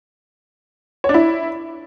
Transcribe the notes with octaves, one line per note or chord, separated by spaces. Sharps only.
C#5
D4
E4